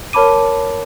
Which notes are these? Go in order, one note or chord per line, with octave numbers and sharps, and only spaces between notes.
A#4 C#5 A5 B5 D6 D#7